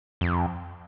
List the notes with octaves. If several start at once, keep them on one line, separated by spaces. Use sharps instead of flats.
F2